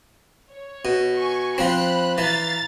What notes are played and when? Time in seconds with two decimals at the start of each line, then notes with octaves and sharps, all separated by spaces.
0.51 C#5
0.85 B2
1.17 G#5 C#6
1.58 F3 C4 B5 F#6
2.18 E3 F5 A#5 A6